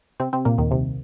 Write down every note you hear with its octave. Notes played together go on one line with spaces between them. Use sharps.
C3 C4
C3 C4
A#2 A#3
D#2 D#3
C2 C3